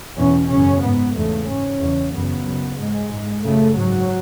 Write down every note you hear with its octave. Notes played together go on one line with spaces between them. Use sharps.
E2 B2 C#4
F#2 C#3 C#4
G#2 B3
E2 C#3 A3
G#2 C#4
E2 C#3
F#2 C#3 B3
F#2 C#3
G#2 G#3
G#2
F#2 C#3 A3
G#2 F#3